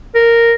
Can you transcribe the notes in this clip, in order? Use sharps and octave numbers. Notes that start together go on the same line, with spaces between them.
A#4